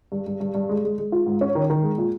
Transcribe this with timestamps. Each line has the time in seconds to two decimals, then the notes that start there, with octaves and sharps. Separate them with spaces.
0.12 G2
0.27 G2
0.40 G2
0.55 G2
0.69 G#3
0.83 G#3
0.98 G#3
1.12 F4
1.26 G#2
1.41 C#4
1.55 D#3
1.70 D#3
1.83 G#3
1.98 A#2